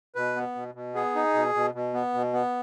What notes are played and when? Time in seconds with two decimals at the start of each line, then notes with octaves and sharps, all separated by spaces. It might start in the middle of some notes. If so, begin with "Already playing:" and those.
0.15 B2 B4
0.36 B3
0.55 B2
0.75 B2
0.95 B3 G#4
1.15 D#4
1.34 B2
1.54 B2
1.74 B2
1.94 B3
2.14 B2
2.33 B3